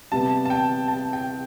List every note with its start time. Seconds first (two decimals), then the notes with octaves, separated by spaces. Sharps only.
0.12 C3 G3 B3 A5
0.45 A5
0.50 G5
0.88 A5
1.13 G5